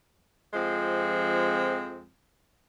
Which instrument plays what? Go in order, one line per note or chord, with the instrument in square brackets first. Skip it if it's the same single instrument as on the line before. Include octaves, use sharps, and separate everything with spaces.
[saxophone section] F2 F3 G#3 C4